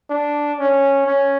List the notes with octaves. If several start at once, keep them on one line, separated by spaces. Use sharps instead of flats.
D4
C#4
C#4